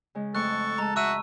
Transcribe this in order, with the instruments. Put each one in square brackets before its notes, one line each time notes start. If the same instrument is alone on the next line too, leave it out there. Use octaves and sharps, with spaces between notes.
[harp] C#3 G#3
[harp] F2 A3 D#6 [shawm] A4 [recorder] C#6 [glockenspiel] F#6
[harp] G#3 [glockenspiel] A5 A#5
[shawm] F#4 [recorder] E5 [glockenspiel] C#6 E6 D#7